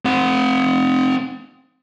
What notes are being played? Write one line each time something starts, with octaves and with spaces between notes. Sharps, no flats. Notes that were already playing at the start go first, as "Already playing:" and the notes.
C4 F#5